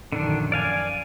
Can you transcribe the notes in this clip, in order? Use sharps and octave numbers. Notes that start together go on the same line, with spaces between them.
A#1 F#2 D3 D#3 D4
D5 F5 G#5